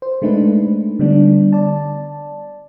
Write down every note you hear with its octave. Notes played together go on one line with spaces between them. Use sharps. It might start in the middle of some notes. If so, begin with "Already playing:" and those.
C5
G#3 A3 D4 D#4 B4
D3 G3 B3 D4
D5 A5